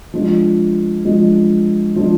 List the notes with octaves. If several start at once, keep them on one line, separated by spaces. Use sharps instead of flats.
F3 G#3 D4
F3 G#3 D4
F3 G#3 D4